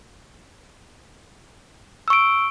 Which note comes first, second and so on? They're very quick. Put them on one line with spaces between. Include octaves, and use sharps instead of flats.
E6 C#6 D7